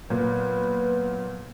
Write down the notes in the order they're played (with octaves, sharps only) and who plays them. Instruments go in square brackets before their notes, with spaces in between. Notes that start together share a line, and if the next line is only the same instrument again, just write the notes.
[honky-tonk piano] A#2 [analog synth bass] F#3 [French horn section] B3 [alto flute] B4